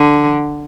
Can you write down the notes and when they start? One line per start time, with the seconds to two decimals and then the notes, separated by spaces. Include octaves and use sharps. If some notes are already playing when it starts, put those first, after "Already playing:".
Already playing: D3